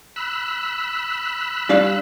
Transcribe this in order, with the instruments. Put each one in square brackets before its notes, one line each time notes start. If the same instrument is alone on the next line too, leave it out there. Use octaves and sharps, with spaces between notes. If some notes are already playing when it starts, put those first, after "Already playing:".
[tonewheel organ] B5 E6 F#6
[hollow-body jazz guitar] G3 D4 F5